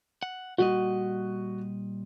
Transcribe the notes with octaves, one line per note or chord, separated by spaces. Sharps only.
F#5
A#2 G3 F#4 D#5